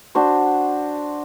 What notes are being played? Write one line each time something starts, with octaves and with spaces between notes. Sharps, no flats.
D4 F#4 C5